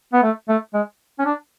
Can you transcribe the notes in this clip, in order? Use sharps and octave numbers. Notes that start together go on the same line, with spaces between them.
B3
A3
A3
G#3
C#4
D4